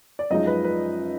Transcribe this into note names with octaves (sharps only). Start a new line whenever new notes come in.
D5
F#2 F3 G#3 D#4 D#5
B4
B4